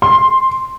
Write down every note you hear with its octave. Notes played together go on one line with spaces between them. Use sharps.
C6